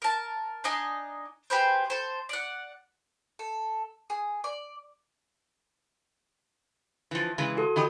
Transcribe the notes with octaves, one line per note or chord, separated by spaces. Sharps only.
A#4 A5
D4 D#4 D#5 G#5
G4 G#4 B4 C5
A4 C5
D5 F#5
A4
G#4
D5
E3 F3
C#3 E3 G#3
F#4 A4
E3 G4 D#5